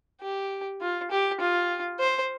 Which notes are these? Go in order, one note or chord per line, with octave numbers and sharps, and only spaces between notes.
G4
F4
G4
F4
C5